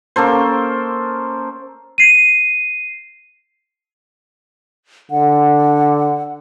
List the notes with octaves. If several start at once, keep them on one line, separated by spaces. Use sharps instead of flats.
A#3 C#4 A4 C5
C7 D#7
D3 F#5